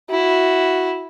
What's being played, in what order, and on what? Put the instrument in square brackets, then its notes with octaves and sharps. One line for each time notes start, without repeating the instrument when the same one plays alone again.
[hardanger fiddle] E4 [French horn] F#4